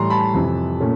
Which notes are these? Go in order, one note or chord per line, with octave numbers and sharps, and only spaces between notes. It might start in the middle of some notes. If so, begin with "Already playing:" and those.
Already playing: A2 E3 G3 A#5 C6
A5 B5
F2 C3 E3
A#2 A3 C#4